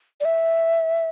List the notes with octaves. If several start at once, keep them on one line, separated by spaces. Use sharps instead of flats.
D5
E5